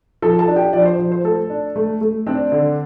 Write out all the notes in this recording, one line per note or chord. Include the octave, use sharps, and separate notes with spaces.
F3 A4 A5
A4 A5
D4
G4 G5
F3 D4 D5
C5
F3
C5
A3 A4
D4
A3
A3
C4 D4 D5
D3